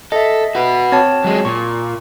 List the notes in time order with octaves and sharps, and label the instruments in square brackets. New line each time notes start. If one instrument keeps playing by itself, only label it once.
[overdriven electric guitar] A4 [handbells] D#5 E5
[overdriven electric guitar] F#4 B4
[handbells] C4 C#5 A5
[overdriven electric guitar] F#3 G#3
[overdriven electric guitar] A#2 [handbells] C#6